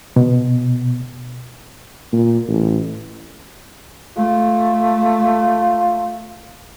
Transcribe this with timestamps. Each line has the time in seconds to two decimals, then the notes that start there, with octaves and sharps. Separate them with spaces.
0.16 B2
2.13 A#2
2.48 A1
4.17 A3 F4